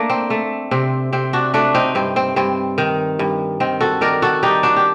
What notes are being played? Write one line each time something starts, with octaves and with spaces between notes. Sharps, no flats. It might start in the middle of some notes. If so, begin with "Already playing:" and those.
Already playing: A3 A#3 D4
C4
A3
C3 C4
C3 C4
D4 F#4
A3 D4 F#4
C4 D#4
G2 C4
C4
G2 C4
D#3
G2
D#3 C4
F#4 A4
D#3 A#4 D5
F#4 A4
G3 D#4 G4
D4 F#4
G4